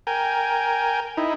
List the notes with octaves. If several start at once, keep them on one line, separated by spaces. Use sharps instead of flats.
A#4 G5 G#5
D#4 E4